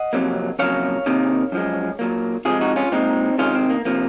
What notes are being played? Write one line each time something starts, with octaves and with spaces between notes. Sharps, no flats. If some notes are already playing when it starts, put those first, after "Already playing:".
Already playing: D#5 F#5
F2 C3 F#3 A#3
F2 C#3 F#3 A#3 C#5 F5
C3 D#3 A#3
F#2 F3 G#3
A#2 F#3 A#3
C3 F3 G#3 F4 G#4
D#4 F#4
C#4 F4
A#2 G#3 C4 D#4
C3 D#3 G#3 C#4 F4
C4
A#3
C3 F3 A#3